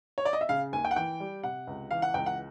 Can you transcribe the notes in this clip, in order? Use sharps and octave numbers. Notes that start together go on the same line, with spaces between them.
C#5
D5
D#5
E5
C#3 F5
D#2 G#5
G5
F#5
E3 G5
G3
C3 F#5
C#2
E3 F5
F#5
C#2 G5
F#5